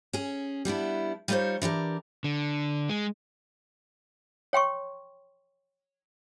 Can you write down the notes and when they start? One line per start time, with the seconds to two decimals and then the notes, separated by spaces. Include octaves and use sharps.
0.13 C#4 G#4
0.65 G3 B3 D4 E4
1.28 G3 D#4 F4 A#4 C5 C#5
1.62 E3 D4 G4 A#4
2.24 D3
2.90 G#3
4.53 C#5 G5 C6 C#6